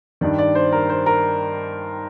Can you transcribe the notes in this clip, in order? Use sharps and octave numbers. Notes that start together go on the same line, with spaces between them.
G2 D#3 D5
D5
C5
A#4
C5
A#4